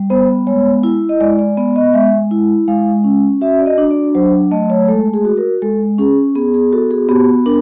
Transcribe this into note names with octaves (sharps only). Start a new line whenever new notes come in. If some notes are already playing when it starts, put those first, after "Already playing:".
Already playing: G3
B3 C5
G#3 C#5
E4
D#5
G#3 D5
D5
B3 D5
D#5
G#3 E5
E4
G#3 F5
C#4
F#4 E5
D5
D#5
D4
D5
F#3 C5
A3 D#5
C#5
G#3 A4
G#4
F#4
A#4
G#3 A4
C#4 G#4
B3 G#4
G#4
F#4 A4
G#4
B3 G4
D4 A#4